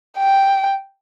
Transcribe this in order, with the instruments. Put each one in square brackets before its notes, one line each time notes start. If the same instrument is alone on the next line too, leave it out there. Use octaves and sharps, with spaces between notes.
[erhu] G5